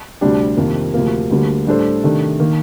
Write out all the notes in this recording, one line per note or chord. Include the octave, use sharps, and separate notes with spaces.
D2 C3 G3 D4 G4
F2 C3 D#3 A#3
D2 C3 F3 A#3
D2 D3 G3 A#3
A2 G3 D4 A4 C5
C3 D#3 A3 D4
D#3 A#3